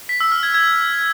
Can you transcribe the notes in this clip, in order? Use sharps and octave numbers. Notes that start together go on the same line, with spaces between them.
B6
E6
F6
G#6
G#6